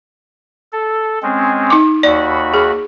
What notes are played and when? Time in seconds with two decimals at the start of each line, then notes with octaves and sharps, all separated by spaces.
0.73 A4
1.22 G#3 C4 C#4
1.70 D#4 D6
2.03 D#2 F#4 D5 B5
2.54 G#4